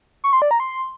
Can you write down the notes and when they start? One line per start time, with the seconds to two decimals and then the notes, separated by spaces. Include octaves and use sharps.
0.24 C#6
0.33 C6
0.42 D5
0.51 A#5
0.60 C6